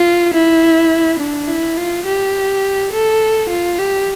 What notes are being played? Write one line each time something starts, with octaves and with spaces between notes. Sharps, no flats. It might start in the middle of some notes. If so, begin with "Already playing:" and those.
Already playing: F4
E4
D4
E4
F4
G4
A4
F4
G4